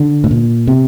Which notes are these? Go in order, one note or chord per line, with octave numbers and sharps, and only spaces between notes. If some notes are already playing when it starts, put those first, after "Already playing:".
Already playing: D3
A2
A#2
C3